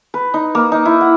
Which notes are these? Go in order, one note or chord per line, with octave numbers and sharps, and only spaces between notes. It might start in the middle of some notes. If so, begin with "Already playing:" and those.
B4
D#4
A#3
D#4
E4
F#5